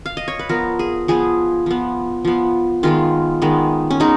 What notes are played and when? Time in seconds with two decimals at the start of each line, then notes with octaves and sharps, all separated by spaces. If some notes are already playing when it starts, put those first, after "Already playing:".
0.06 F5
0.17 D#5
0.28 C#5
0.39 B4
0.49 F3 B3 A#4
0.79 G#4
1.08 F3 B3 G#4
1.66 F3 B3
2.25 F3 B3
2.83 D#3 G#3 B3 F4
3.42 D#3 G#3 B3
3.91 C#4
4.00 G#3 B3 D#4